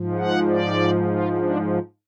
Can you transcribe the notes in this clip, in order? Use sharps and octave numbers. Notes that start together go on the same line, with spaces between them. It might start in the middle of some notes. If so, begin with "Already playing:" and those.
Already playing: G#2 F3
F#5
D5
F4
D4